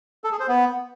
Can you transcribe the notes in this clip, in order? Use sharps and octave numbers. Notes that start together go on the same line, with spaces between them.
A4
G#4
C5
B3